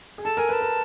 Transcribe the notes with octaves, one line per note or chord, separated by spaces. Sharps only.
G#4
A4 A5
A#4 G#5
B4 A5
A#4